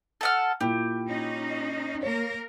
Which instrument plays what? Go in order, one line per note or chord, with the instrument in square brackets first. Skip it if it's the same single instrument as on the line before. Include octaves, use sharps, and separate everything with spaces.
[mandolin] A4 F#5 F6
[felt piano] A#2 E4 [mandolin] G4
[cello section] C#4 D#4
[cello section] A#3 A#4 [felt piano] C#5